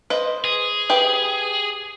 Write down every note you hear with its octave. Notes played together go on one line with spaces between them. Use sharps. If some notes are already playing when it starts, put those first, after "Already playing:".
B4 C5 D#5
G#4
G4 B4